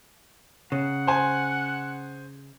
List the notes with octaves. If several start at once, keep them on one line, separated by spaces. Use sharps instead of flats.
C#3 F#5
C5 G#5